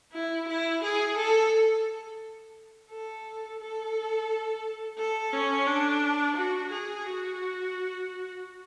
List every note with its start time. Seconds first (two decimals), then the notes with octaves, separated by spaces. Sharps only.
0.13 E4
0.48 E4
0.83 G#4
1.17 A4
2.90 A4
3.60 A4
4.98 A4
5.33 C#4
5.67 D4
6.36 F#4
6.71 G#4
7.06 F#4